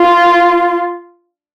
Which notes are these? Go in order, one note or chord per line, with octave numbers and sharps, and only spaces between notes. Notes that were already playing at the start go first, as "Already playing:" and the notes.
Already playing: F4